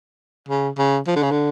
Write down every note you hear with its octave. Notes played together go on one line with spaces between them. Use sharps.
C#3
C#3
F3
D3
C#3
D3